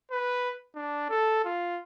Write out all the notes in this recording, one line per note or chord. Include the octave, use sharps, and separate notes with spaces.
B4
D4
A4
F4